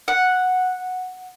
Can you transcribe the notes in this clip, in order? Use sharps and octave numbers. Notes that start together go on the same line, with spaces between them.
F#5